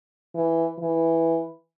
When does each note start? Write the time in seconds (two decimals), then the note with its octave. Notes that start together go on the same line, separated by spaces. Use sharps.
0.35 E3
0.79 E3